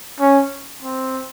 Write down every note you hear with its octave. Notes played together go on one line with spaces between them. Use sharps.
C#4
C4